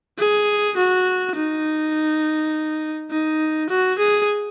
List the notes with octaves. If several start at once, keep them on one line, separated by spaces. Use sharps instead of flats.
G#4
F#4
D#4
D#4
F#4
G#4